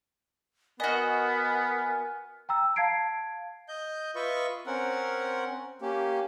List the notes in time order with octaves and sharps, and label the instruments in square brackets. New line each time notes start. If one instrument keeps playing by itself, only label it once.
[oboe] B3 [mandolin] F#4 D#5 [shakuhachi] A#4 [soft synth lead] G#5
[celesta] G5 A#5 E6
F5 A5 G#6 C7 D7
[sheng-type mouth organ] D#5 G6
F4 B4 D#5 E5 C#6
C4 C#4 A#4 F#5
A#3 C#4 G4